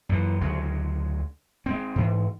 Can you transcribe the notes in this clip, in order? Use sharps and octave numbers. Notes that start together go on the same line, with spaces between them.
F#2 E3
D2 C#3 F#3 G#3
G#3 C4
G#2 E3